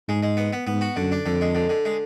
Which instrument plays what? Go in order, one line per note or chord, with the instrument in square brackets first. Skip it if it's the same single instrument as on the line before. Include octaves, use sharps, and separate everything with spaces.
[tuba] G#2 [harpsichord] G#3
[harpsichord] G#3
B3
B3
[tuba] G#2 [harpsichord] B3
[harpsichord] F#4
[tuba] F#2 [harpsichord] D3
[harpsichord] D4
[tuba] F2 [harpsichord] D3
[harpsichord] G#3
D3
D3
G#3